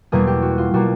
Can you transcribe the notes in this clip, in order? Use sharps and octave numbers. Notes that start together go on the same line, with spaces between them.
E2 B2 G3 A#3 G#4
G4
F#4
F4
B2 G3 A#3 F#4